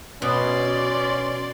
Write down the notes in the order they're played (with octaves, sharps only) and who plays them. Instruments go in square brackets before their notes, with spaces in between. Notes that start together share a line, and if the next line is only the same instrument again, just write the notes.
[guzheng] B2 [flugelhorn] C#4 [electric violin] D5 C6